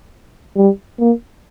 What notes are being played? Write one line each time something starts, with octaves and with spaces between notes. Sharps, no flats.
G3
A#3